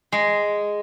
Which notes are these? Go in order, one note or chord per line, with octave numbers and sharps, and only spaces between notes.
G#3